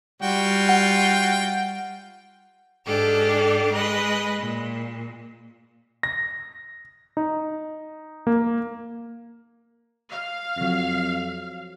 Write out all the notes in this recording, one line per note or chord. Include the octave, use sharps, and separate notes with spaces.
G3 F4 F#4 G5
F#5
G#2 D4 G4 A4 F6
G#3 B4 D#5
A#2
A#6
D#4
A#3
F5
F2 F#3 A#6